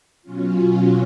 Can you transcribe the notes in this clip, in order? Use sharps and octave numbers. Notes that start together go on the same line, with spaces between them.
B2 F#3 C#4 F4